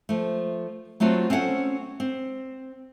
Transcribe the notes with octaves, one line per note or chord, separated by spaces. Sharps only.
F3 A3
F#3 A3 C4 F4 F#4
C4 C#4 A4 F5 F#5 G#5
C4